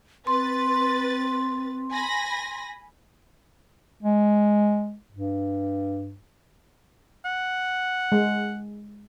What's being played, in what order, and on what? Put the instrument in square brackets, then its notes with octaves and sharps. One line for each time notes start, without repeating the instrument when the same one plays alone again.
[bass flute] C4 [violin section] B4 A6 [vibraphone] C6
[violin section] G#5 B5 A#6
[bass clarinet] G#3
G2
[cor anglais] F#5
[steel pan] G#3